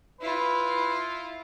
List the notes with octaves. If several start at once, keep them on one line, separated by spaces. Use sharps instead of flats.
E4 F4 B4